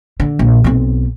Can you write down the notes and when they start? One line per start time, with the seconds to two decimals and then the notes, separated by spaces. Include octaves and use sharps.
0.20 D3
0.39 A#1
0.64 B1 C4